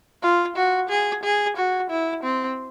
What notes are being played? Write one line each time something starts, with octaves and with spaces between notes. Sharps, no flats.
F4
F#4
G#4
G#4
F#4
E4
C4